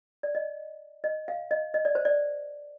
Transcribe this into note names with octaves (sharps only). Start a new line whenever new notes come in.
D5
D#5
D#5
F5
D#5
D#5
D5
C5
D5